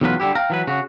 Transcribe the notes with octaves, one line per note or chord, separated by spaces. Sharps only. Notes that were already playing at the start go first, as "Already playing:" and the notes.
B1 E2 A2 F#3 F4 B4
D3 G3 E4 G4
F5 G5 A#5
E3 F#3 B4
C#3 F#4